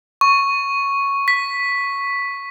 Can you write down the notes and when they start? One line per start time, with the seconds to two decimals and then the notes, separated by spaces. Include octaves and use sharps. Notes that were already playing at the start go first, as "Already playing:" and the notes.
0.21 C#6
1.28 B6